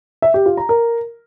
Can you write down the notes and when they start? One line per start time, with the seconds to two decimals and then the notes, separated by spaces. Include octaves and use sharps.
0.22 E5
0.34 G4
0.46 F4
0.57 A#5
0.69 A#4